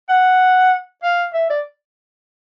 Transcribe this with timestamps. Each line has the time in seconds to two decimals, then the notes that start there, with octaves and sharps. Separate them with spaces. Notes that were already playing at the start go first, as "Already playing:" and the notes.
0.09 F#5
1.03 F5
1.34 E5
1.50 D5